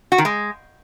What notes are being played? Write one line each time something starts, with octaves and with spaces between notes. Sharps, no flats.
F#4
D#3
G#3